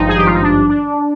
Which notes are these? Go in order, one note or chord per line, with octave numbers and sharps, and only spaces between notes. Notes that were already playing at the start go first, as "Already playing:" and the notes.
Already playing: G#1 G2 F3 D#4
G#4
G4
F4
D#4
D4
D4